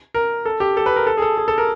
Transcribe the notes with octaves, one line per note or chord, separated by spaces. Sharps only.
A#4
A4
G4
A4
B4
A#4
A4
G#4
A4
G#4
A4
A#4